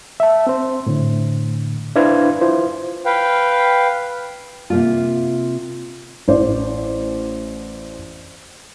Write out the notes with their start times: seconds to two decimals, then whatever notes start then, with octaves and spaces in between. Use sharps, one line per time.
0.20 E5 A5
0.47 C4 C5
0.86 A2 D3
1.96 D4 E4 B4 C5 F5 G#6
2.41 E4 F4 C5
3.06 B4 F5 G5
4.70 C3 A#3 F4
6.28 A1 C5 D5